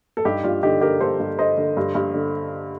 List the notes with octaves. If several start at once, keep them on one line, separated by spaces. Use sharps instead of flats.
A4
G2 D#4 G4
G2 D4 F4
D3 D#4 G4
D3 G4 A#4
G2 A4 C5
G2
D3 C5 D#5
D3
G2
G2
D3